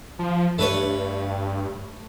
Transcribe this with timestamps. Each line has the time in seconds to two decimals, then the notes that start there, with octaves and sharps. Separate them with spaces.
0.19 F3
0.58 G2 A3 B4 C#5